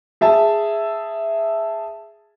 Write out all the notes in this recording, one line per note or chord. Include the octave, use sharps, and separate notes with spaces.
G#4 E5 A5